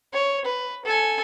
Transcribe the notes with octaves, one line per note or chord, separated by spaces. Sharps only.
C#5
B4
A4 G#5